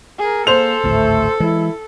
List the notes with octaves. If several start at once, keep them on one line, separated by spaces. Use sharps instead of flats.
G#4 A#4
A#3 A4 C5 F7
G#1 D2 A2 A3
E3 G#3 E4